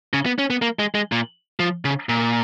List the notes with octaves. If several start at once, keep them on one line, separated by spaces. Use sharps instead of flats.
C#3
B3
C#4
B3
A#3
G#3
G#3
A#2
F3
C#3
A#2